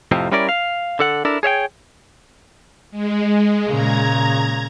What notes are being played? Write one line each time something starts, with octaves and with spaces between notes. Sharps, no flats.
F2 A2 C3 F3 C4
G3 C#4 E4 A#4 D5
F5
D3 A4 F#5
D4 E4 A4 A#4
G#4 C#5 E5 G5
G#3
A#2 C#3 A#5 G#6